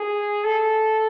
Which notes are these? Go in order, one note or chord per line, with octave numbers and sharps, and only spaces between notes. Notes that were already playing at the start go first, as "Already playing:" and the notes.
Already playing: G#4
A4